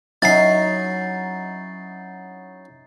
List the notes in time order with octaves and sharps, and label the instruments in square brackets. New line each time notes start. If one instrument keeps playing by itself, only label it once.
[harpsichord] F#3 C#4 E4 [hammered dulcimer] D#4 A#5 [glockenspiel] A6 C7